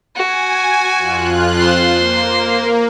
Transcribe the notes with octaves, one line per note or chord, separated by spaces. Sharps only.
F#4 G#5
F2 F4 F#6
C5 C6
A#3